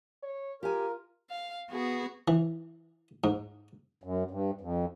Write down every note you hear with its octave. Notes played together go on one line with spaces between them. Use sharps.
C#5
F4 G4 A#4 G#5
F5
B3 F#4 G#4
E3
G#2
F#2
G2
F2